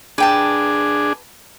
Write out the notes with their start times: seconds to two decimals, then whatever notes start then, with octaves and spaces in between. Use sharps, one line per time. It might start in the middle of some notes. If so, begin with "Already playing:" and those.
0.18 D4 G#4 B4 G5 A5